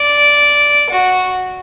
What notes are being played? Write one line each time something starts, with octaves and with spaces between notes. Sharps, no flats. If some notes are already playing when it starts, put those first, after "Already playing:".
Already playing: D5
F#4